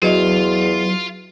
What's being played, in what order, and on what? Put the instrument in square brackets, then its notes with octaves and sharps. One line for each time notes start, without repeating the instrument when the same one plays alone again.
[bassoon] E2 [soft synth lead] F#3 [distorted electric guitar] F4 [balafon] F#4 B4 D#5